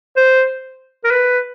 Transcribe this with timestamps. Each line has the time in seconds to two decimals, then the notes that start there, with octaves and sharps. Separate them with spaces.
0.16 C5
1.04 A#4
1.11 B4